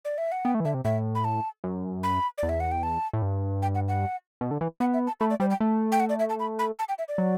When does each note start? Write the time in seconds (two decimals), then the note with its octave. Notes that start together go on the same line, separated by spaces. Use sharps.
0.05 D5
0.18 E5
0.32 F#5
0.45 B3 G5
0.54 A3
0.60 E3
0.65 D3 E5
0.74 C3
0.85 A2 E5
1.15 B5
1.24 A5
1.64 F#2
2.03 B5
2.38 E2 D5
2.49 E5
2.60 F#5
2.72 G5
2.83 A5
3.13 A2
3.22 G2
3.62 G5
3.75 F#5
3.88 F#5
4.41 B2
4.51 D3
4.61 E3
4.80 B3 F#5
4.93 E5
5.07 A5
5.20 A3 B5
5.30 D5
5.40 G3 C5
5.50 G5
5.60 A3
5.92 G5
6.00 F#5
6.09 D5
6.19 E5
6.29 A5
6.40 B5
6.59 B5
6.79 A5
6.89 G5
6.98 E5
7.08 D5
7.18 F#3